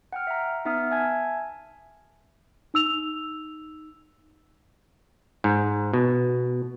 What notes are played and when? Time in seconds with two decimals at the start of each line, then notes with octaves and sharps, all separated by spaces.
0.13 F#5 G5 F6
0.27 E5 A#5
0.65 B3 D#4 E5 F#5 D#6 F6
0.91 E5 G#5 A5 G#6
2.74 D#4 E6 F7
5.44 G#2
5.93 B2